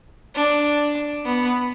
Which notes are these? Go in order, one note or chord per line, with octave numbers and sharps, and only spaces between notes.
D4
B3